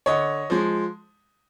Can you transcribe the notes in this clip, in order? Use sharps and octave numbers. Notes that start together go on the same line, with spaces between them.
D3 C#5 D#5
F3 G#3